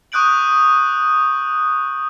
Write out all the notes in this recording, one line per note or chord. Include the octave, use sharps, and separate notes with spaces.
C#6 D#6 F#6 G6 D7 F#7